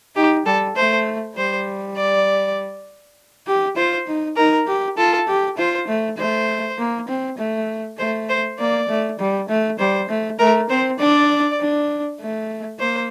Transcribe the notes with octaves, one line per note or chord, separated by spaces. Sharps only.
D#4 G4
G3 A4
A3 C5
G3 C5
D5
G4
F4 C5
D#4
D#4 A#4
G4
F4 A4
G4
F4 C5
A3
A3 C5
A#3
C4
A3
A3 C5
C5
A#3 D5
A3
G3
A3
G3 C5
A3
A3 A#4
C4 C5
D4 D5
D4
A3
A#3 C5